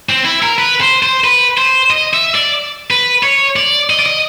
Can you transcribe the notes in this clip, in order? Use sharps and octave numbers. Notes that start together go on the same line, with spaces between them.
C4
E4
A#4
B4
C5
C5
B4
C5
D#5
E5
D5
B4
C#5
D5
D#5
D5
D#5